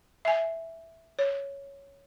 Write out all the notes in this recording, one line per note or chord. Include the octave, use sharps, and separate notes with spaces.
E5 G#5
C#5